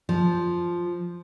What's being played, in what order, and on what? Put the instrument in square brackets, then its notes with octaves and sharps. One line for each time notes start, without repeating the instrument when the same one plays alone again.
[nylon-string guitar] F3